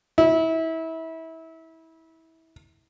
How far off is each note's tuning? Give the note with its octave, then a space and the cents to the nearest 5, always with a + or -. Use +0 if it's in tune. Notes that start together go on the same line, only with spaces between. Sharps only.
E4 -25